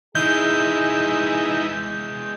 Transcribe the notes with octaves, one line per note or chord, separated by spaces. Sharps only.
E3 G#3 D#4 E4 G#4 G6